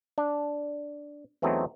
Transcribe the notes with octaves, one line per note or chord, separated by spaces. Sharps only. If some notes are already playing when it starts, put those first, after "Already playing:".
D4
E2 E3 F#3 A3 C4 D#4